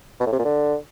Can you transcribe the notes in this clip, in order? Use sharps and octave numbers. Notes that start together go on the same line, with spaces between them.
B2
A2
C3
A#2
D3